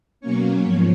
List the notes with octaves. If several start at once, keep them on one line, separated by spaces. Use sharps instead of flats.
B2 F#3 A#3 C#4 C#5
G#2 F3 C#5